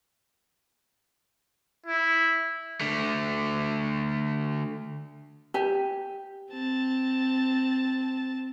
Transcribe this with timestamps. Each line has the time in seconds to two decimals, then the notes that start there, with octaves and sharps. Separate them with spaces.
1.86 E4
2.81 D3 A3
5.54 G4 G#5
6.50 C4 A5